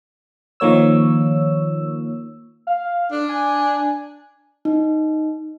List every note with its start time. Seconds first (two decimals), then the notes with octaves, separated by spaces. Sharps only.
0.60 D#3 F3 A#3 C#5 E6
2.67 F5
3.12 D4
3.29 G#5
4.65 D#4